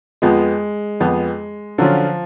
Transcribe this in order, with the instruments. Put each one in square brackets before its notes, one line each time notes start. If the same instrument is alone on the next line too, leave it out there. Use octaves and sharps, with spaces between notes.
[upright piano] F2 F3 B3 [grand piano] G#3
[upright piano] F2 F3 B3
[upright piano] D3 F#3 C#4 F4 [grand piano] F3